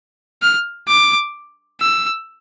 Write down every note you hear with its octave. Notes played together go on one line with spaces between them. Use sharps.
F6
D6
E6